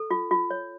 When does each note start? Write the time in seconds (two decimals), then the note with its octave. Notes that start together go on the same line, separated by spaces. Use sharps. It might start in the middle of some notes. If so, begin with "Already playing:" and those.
Already playing: A4
0.11 F4
0.31 F4
0.50 C#5